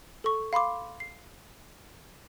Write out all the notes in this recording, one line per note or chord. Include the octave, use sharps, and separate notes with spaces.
A4 C#6
F5 B5 C6 D6
C7